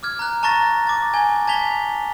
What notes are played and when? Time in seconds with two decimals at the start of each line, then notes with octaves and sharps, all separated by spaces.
0.03 D6 F6 G#6
0.19 A#5 F#6
0.43 A5 A#5 C#6 A6 A#6
0.87 D6 A6
1.14 G#5 G#6 G7
1.47 A5 G#6 B6 F7 G7